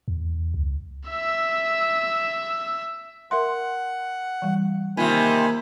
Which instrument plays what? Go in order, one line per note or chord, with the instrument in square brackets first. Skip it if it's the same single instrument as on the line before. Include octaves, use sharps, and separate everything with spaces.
[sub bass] E2
C#2
[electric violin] E5 E6
[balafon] A#4 E5 C6 [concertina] F#5
[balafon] E3 G3
[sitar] C3 D#3 [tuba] A#3 [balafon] F4 [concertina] G#5 B5